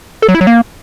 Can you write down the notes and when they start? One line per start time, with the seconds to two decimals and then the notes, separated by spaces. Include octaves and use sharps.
0.22 A4
0.29 F#3
0.35 E4
0.41 F#3
0.47 A#3